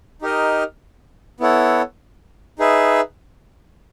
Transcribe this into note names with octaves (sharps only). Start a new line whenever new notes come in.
D#4 G4 A#4 D#5
B3 E4 A4 C#5 F#5
D#4 G#4 B4 E5